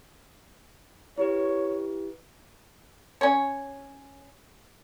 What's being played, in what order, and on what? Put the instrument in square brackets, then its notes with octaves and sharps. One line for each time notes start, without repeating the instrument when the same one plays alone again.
[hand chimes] E4 G4 B4 [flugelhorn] C#5
[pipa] C#4 C#5